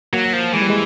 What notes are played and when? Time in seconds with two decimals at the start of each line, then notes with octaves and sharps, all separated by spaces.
0.13 F#3 A#3
0.33 F3
0.54 E3 G#3
0.62 G3
0.70 G#3